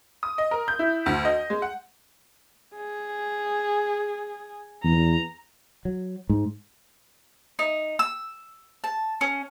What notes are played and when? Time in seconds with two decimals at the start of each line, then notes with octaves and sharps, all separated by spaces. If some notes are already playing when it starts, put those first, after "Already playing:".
0.23 D#6
0.38 D#5
0.51 A#4
0.68 G6
0.79 E4
1.06 D2
1.25 D#5
1.50 G#3
1.62 F#5
2.76 G#4
4.83 E2 A#5
5.85 F#3
6.30 G#2
7.59 D#4
7.99 E6
8.84 A5
9.21 C#4